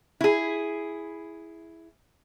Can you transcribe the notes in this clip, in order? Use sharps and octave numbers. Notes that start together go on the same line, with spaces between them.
E4 G#4